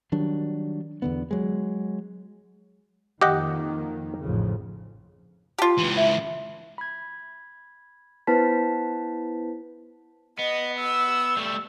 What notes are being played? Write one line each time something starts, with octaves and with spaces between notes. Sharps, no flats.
D#3 F#3 G3 D4
E2 D3 B3
F#3 G#3
F2 D#3 A#3 G4 D#5 F#5
A1 F2 C#3
F4 G4 A5
C#2 E3
E5
B5 G#6
B3 E4 B4 C5 A5 B6
B3 D#5
E6
G3 A3